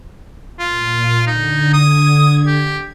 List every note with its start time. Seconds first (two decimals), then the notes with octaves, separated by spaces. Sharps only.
0.59 A#2 F4
1.27 D3 D#4 G#6
1.73 D#6
2.47 G4